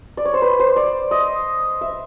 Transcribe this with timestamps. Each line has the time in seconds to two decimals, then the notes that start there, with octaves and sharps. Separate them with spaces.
0.17 D5
0.25 C#5
0.34 C5
0.42 B4
0.60 C5
0.76 D5
1.11 D#5
1.81 E5